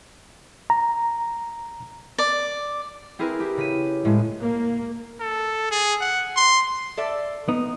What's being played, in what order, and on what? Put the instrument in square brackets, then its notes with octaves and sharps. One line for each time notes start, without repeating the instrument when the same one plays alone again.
[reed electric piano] A#5
[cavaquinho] D5
[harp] C4 E4 G#4 A#4 B4
E4 G4
C#3 B6 D#7
A2 C#3 G#3
[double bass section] A#3
[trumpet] A4
G#4
F#5
C6
[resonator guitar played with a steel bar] A4 D5 E5
[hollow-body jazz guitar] B3 D#4